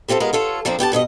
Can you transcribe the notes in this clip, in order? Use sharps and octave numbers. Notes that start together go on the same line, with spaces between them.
G3 C4 F4 F#4 A4
G#3 B3 F4 A#4 B4
F4 A4 C#5
F2 F3 A#3 C4 D4
B3 G4 G5 A5
G2 B2 F#4 D#5